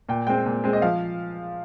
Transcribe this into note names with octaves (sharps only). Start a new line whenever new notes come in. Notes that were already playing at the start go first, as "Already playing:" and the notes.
A#2 G5
G#3 C4 G5
A#2
G#3 C4
D#5
F3 F5